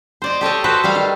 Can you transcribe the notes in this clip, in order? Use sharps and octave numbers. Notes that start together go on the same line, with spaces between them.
C5 D5 D#5
G4 A4 C#5 D#5
F#4 A4 B4 C5 G5
G3 B4 F5
D#3